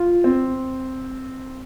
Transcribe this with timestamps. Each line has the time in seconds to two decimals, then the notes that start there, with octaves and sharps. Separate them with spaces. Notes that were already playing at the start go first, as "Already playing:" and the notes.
Already playing: F4
0.24 C4